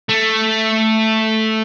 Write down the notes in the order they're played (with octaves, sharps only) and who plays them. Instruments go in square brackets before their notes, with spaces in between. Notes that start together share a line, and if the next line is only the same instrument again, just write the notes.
[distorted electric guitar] A3